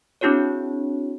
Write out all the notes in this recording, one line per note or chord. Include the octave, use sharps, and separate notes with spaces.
C4 D4 E4 F#4 G#4 C#5